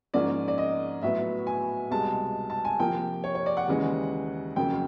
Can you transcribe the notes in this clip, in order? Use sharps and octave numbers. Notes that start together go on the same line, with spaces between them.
G#2 F3 A#3 C#4 D5
D5
D#5
A2 F#3 B3 E5
G#5
C2 B2 G#3 A5
A5
G#5
C3 F3 A#3 G5
C#5
C#5
D5
F#5
D#2 C#3 E3 G#3
F2 C#3 F#3 A#3 G5